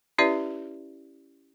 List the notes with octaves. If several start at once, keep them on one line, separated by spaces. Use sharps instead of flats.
C#4 E4 G4 B4 D5 E5